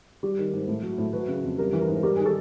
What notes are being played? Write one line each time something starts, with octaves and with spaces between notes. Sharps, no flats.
G3
D#3
G#2
A2
F#3
A2
F#3 B4
C#3
F2
G3 A#4
E3
A#4
G#2
G3 A#4
D#3 G#4
A4